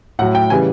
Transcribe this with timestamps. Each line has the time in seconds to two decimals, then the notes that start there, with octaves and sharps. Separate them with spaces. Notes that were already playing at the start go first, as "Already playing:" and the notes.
0.19 A2 F#5
0.22 F#3
0.35 G5
0.50 C#3 E3 G3 G#5